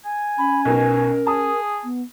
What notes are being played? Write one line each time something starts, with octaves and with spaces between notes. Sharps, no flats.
G#5
C#4 B5
B1 B2 A#4
G#4 A5 D#6
B3